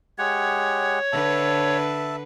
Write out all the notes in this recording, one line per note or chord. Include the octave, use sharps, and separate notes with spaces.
G#3 G4 C#5 F#5
D3 B4 E5 A5